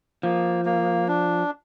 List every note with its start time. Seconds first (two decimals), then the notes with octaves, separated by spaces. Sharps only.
0.23 F3 A#3
0.65 A#3
1.08 D4